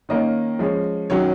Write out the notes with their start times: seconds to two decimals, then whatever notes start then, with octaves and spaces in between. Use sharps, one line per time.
0.09 D#3 A#3 C#4 D#5
0.59 F3 G#3 C#4
1.10 D#3 F#3 C#4 C#5